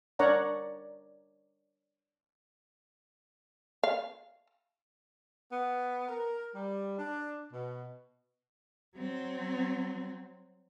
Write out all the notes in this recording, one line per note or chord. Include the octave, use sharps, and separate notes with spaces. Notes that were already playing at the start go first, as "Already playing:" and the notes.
D4 A#4 C#5 D5 F#5 A#5
F5
B3
A#4
G3
D4
B2
F#3 C4